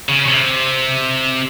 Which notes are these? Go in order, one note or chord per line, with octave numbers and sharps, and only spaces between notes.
C#3
C3